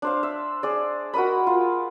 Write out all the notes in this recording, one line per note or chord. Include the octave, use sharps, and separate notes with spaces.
D4 C5 F5
E5
G#4 D5
F#4 A#4 D#5 B5
F4